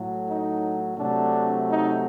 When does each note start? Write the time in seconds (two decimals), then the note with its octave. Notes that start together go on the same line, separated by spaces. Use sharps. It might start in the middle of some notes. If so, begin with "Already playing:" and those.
Already playing: A2 F#3 A3
0.27 D#4
0.97 C3 F#3 A3 D4
1.67 D#4